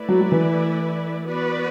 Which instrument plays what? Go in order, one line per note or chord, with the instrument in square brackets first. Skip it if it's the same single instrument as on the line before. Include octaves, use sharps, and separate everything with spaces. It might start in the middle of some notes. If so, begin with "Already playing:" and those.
Already playing: [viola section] A3 E4 B4 D5
[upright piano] F#3
F#3
E3
[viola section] B3 F#4 B4 D5